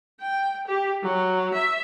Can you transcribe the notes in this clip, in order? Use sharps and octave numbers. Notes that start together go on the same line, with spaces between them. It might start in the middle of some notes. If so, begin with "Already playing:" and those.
G5
G4
F#3
E5